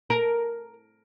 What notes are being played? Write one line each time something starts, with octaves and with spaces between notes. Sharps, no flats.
A#4